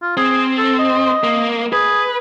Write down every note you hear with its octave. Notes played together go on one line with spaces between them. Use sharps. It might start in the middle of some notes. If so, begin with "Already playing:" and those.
F4
C4 G#4
A4
D#5
A#3
G#4 B4